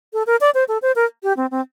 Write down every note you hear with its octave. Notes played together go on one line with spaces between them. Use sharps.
A4
A#4
D5
C5
A4
C5
A#4
G4
C4
C4